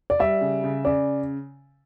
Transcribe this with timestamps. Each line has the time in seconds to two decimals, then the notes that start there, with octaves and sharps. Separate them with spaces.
0.10 D5
0.19 G3 E5
0.41 C#3
0.64 C#3
0.85 C#3 D5